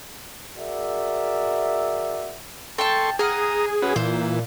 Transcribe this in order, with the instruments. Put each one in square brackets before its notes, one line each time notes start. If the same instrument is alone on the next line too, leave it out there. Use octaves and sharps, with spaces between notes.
[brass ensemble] F#4 G#4 A#4 D5 E5
[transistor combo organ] A4 C6 C#6 [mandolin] G5 A5
[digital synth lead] G#4 [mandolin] F#5 F6 [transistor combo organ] A#5 D#6
[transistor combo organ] C#4 F#4 B4
[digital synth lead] A#2 [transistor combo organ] E3 [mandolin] C5